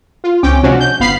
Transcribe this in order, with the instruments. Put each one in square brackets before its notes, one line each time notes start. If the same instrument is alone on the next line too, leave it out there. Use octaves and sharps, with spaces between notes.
[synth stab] F4
C#2 C4 C#4 G5 D6
C3 F3 G#3 C#4 D4 F#4
G6
G1 B3 F5 B5 C7